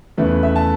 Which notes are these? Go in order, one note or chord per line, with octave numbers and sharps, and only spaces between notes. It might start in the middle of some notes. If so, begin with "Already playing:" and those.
E2 C#3 A3 B4
E5
A5